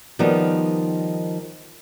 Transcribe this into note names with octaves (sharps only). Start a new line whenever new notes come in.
D#3 F3 G3 B3 D#4